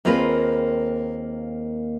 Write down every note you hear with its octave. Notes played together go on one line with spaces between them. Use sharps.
D#2 A#3 C4 F4 G#4 B4